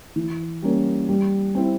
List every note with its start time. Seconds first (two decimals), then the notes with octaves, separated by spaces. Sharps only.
0.16 E3
0.62 G3 A#3 C#4
1.09 G3
1.55 C4 E4